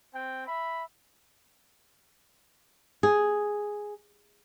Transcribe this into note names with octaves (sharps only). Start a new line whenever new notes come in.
C4 G5
E5 B5
G#4